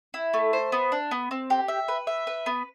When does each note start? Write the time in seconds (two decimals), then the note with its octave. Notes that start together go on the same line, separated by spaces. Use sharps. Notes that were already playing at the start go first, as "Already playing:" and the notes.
0.14 E4
0.34 A3
0.53 C5
0.72 B3
0.92 D4
1.11 B3
1.31 C4
1.50 G4
1.68 E5
1.88 B4
2.07 E5
2.27 B4
2.46 B3